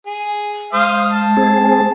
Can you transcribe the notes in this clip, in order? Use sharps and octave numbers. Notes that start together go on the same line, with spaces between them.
G#4
G#3 C5 F5 D#6
A5
C4 G#4